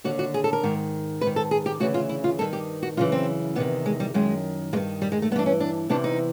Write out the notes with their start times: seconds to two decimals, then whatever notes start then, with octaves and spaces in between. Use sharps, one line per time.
0.04 D#2 D3 F#4
0.19 F#4
0.34 G#4
0.44 A4
0.53 A#4
0.63 G#2 D#3
1.21 G#2 B4
1.27 D#3
1.36 A4
1.51 G#4
1.66 G4
1.80 D2 C#3 E3 F#4
1.94 F4
2.09 E4
2.24 F4
2.39 G2 D#3 A4
2.53 G4
2.83 F#4
2.97 F#2 C#3 E3 F4
3.12 C4
3.55 E2 C3 D#3 B3
3.86 G#3
4.00 G3
4.14 F#2 D#3 G#3
4.73 G2 G#3
4.76 D#3
5.02 G3
5.12 G#3
5.22 A3
5.32 G2 B3
5.36 E3 D4
5.46 C#4
5.60 D4
5.89 E2 C3 E3 D4
6.04 D#4